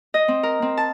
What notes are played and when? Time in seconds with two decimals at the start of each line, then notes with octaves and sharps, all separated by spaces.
0.14 D#5
0.28 C4
0.43 A#4
0.62 C4
0.77 A5